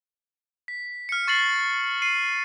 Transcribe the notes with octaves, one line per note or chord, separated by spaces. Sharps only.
B6
F6 C#7
C#6 A6 C7 F#7
C7 D#7